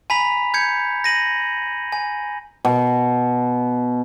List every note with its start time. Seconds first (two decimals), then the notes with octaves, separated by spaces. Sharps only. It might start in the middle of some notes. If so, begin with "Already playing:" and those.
0.10 G#5 A#5 B5 B6 F7
0.54 G6 G#6 C#7
1.04 A#6 D#7 F#7
1.92 G#5
2.65 B2